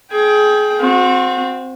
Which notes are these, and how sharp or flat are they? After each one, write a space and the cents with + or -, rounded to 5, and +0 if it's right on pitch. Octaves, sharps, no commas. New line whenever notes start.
G#4 +25 G5 +0
C4 +0 F#4 -30